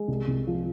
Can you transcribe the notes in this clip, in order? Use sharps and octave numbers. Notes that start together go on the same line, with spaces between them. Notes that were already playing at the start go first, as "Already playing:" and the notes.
Already playing: G#3
C2
C2
F3